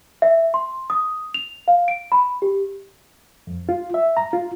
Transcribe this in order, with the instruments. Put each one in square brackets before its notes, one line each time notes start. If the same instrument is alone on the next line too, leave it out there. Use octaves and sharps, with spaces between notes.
[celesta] E5
C6
D#6
F7
F5
D7
B5
G4
[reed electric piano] F2
F4
E5
A#5
F4